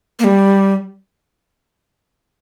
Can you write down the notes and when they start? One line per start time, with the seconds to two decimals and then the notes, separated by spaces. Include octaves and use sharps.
0.19 A#3
0.24 G3